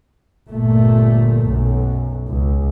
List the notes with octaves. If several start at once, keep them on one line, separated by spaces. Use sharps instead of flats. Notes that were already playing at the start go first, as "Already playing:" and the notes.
G1 A#2 A3
B1 F#2
C#2